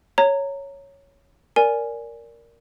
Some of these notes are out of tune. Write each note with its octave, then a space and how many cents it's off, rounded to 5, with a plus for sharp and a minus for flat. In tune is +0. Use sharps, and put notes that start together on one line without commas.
C#5 +0 A#5 -20
A#4 +0 D5 -15 G#5 +0